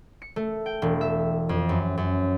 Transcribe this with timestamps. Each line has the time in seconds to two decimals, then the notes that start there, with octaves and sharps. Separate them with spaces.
0.22 C#7
0.36 A3
0.66 G5
0.82 E1
1.01 E5
1.49 F2
1.69 F#2
1.97 F#2